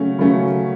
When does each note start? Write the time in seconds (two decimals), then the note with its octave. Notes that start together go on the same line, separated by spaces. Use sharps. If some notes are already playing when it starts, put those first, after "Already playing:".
Already playing: C#3 F#3 A3 C#4
0.19 C#3 F#3 A3 C#4